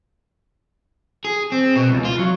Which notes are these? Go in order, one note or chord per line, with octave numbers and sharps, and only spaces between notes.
G#4
C4
B2
C#2
F4
F#3